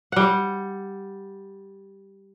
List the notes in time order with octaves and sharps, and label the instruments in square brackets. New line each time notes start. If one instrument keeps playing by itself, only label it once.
[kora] G3 F#5